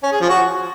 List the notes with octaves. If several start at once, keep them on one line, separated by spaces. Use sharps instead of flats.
C#4
G#4
F3
F#4